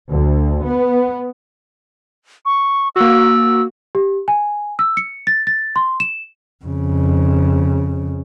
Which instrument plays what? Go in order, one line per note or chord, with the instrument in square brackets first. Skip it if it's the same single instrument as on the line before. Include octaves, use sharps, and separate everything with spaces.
[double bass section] D2
B3
[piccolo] C#6
[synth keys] A#3 F#4 [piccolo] E6
[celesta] G4
G#5
E6
C#7
A6
A6
C6
E7
[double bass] F2 C#3